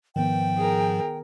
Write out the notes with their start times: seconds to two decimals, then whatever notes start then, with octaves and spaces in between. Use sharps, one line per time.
0.16 G#2 D#3 F3 B3 G5
0.57 G#4 A#4